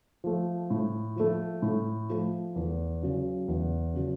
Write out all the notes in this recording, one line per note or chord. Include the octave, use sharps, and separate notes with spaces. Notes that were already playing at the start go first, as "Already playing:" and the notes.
F3 A3
A2
F3 A3
A2
F3 A3
E2
C#3 F#3
E2
C#3 F#3